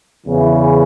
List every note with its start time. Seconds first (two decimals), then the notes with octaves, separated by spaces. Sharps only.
0.24 E2 C#3 E3